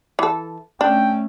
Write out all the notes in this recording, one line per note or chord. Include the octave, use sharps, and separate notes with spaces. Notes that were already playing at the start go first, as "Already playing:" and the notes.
E3 A4
A3 C#4 D4 G5